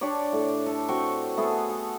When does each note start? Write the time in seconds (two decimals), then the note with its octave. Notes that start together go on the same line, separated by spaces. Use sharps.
0.01 D4 G4 C#5 D5
0.32 A2
0.66 A4
0.88 C4 F#4 G5 C#6
1.37 A3 B3 G#4 A4
1.70 A4